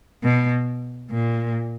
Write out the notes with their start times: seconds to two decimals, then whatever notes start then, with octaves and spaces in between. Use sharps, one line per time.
0.22 B2
1.10 A#2